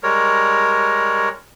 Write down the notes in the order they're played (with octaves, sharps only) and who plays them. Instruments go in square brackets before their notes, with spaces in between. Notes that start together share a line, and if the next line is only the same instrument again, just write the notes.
[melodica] G3 G#3 A#4 C#5